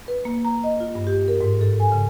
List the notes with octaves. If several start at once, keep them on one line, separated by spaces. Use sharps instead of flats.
B4
A#3
A#5
D#5
F4
G2
G4
A#4
G#2
A4
G#5
C#3